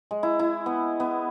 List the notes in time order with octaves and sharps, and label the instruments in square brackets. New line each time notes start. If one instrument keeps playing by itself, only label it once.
[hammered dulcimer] G#3
E4
E4
B3
B3